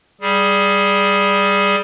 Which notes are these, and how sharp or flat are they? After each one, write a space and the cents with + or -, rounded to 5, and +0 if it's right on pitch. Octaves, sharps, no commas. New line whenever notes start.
G3 +0 G#4 +0